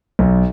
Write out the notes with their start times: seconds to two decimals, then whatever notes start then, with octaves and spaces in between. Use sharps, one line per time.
0.19 B1